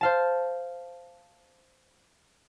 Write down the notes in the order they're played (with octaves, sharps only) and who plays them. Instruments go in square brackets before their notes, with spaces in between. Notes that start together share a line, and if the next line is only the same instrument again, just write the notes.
[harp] C5 F5 A5